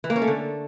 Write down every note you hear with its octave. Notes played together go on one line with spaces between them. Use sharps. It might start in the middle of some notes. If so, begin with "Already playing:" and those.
E3
A#3
C#4
A3
D3